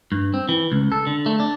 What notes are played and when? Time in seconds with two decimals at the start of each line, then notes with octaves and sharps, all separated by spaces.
0.12 G2
0.34 C4
0.49 E3
0.72 C#2
0.92 A4
1.07 D3
1.26 A3
1.40 D4